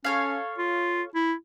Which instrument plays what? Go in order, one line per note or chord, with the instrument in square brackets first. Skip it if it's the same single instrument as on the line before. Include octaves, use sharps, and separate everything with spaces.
[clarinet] C#4 [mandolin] A4 C#5 F5
[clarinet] F4
E4